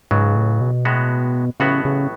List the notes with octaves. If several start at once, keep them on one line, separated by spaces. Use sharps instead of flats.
C#2 G#2 C#3 F#3
A2
B2
A2 G#3 B3 F#4
A1 A2 C#3 F#3 B3 F#4
C#3